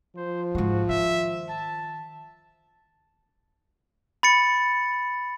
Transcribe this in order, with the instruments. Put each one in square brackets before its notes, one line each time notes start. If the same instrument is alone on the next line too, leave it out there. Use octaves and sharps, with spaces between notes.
[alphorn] F3 [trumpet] C5
[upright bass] G#2 G#3 [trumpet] F#4
[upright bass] D#3 [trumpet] E5
[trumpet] A5
[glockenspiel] B5 A6 C#7